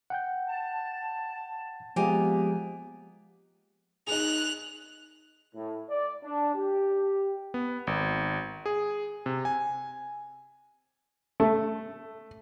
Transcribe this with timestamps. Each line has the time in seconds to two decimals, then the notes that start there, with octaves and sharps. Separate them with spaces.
0.10 F#5 G5 G6
0.47 A5
1.96 F3 G#3 A#3 B3 G4 G#5 A#5
4.07 D#4 G#4 F#6 F7
5.55 A2
5.90 D5
6.24 D4
6.55 G4
7.54 B3
7.87 G#1
8.66 G#4
9.26 C3
9.45 G#5
11.40 A3